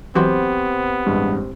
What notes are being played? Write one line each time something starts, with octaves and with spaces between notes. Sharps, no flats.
E3 F#3 B3 C4 G4 C5
A1 G2 G#3